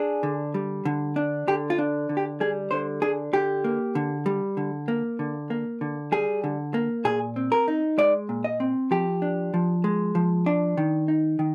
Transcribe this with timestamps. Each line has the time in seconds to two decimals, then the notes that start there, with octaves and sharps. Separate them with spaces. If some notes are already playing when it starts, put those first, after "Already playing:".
Already playing: D4 G#4
0.23 D3
0.54 G3
0.85 D3
1.16 D4
1.48 D3 G4
1.70 F4
1.78 D4
2.09 D3
2.17 G4
2.40 G3 G#4
2.71 D3 C5
3.02 D4 G#4
3.33 D3 G4
3.64 A#3
3.95 D3
4.26 G3
4.57 D3
4.88 A#3
5.19 D3
5.50 A#3
5.81 D3
6.12 G3 G#4
6.44 D3
6.74 A#3
7.05 A#2 G#4
7.36 C4
7.52 A#4
7.68 D#4
7.98 G#3 D5
8.29 A#2
8.44 D#5
8.60 C4
8.91 F3 G4
9.22 D4
9.54 F3
9.84 G#3
10.15 F3
10.46 D4
10.77 D#3
11.08 D#4
11.39 D#3